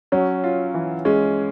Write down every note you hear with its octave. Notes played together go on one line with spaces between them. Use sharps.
F#3 C#4
F4
E3
G#3 C#4